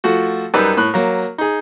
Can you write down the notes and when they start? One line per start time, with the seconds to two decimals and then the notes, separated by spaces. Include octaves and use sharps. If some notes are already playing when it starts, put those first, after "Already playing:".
0.04 F3 A3 F#4
0.54 F#2 G3 D#4 B4 D#6 E6
0.77 A2 B5 F#6
0.94 F#3 A#3
1.38 D#4 G#4